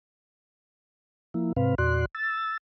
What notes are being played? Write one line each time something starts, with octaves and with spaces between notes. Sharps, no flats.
F3 A#3 E4
G#2 C3 C4 B4 F5
E2 A#2 F#4 D5 C6 F#6
E6 A6